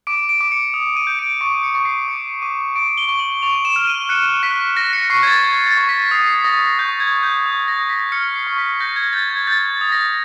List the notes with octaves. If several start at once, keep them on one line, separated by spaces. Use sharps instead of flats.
D6 D7
D7
D6
C#7
D#6
D#7
G6
D7
C#6 C#7
C#7
C#6
C7
D6 C#7
D6 D#7
C#6 D7
G7
C#6
F#7
C#6 F7
E7
F6
D#7
F#6 C#7
F#6 B6
F#6 A#6
C#7
C#6 C7
G#6
A6
C#6 G#6
A6
C#6
B6
D#6 C7
C7
D#6 A#6
C#6 G6
G#6
C#6
G6
D#6
A#6
D#6
B6
F6 C#7
C7
C#6
B6
G6 A#6
G#6
G6 A6
G#6
G6 A6
D#6
A#6